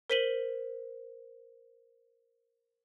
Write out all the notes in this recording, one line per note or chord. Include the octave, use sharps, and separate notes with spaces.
A#4 C5 B6 D#7 F#7 G7